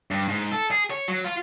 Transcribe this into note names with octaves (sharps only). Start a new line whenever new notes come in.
G2
G#2
A4
G#4
C#5
F#3
F4